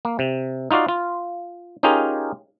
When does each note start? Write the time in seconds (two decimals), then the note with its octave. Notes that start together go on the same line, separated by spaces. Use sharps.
0.05 A#3
0.19 C3
0.71 D#4 F4 F#4 D5 F5
0.88 F4
1.83 C#4 D#4 F4 G4 G#4 A#4